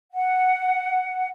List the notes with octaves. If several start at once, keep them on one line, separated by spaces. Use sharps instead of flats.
F#5